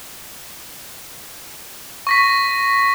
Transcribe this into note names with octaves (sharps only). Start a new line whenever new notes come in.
C#6 A#6 B6